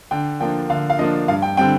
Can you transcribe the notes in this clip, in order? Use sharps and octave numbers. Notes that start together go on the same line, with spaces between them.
D3 G5
F3 A#3 D4 G5
D3 F5
F5
F3 A#3 D4 D#5
G2 F5
G5
D3 G3 C4 G5